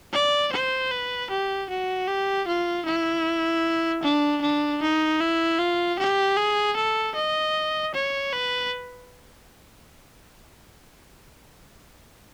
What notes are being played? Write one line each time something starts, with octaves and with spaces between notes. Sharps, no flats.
D5
C5
B4
G4
F#4
G4
F4
E4
D4
D4
D#4
E4
F4
G4
G#4
A4
D#5
C#5
B4